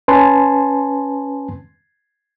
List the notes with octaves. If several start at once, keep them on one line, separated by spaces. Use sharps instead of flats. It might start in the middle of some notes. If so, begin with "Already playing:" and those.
C#4 B4 G#5 A5 C6